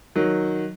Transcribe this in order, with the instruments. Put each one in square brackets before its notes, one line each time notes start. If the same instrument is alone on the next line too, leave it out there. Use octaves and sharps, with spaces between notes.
[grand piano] D#3 F#3